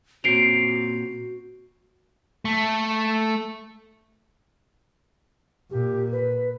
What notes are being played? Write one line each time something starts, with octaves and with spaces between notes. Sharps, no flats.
A#2 C4 C#4 F#4 C7 D7 F7
A3
A#2 G4
B4